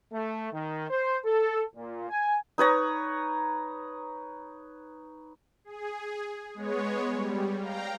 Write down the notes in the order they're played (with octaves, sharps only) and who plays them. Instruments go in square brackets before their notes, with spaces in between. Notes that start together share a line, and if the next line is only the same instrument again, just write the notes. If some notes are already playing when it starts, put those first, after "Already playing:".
[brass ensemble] A3
D#3
C5
A4
A#2
G#5
[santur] D#4 B4 C#5 A#5
[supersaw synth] G#4
G#3 B3 C#5
G3
F5 G5 A#5